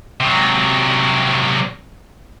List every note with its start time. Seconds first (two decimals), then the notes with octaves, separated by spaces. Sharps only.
0.20 C3 F#3